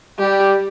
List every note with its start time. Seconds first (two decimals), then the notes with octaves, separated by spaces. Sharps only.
0.19 G3 G4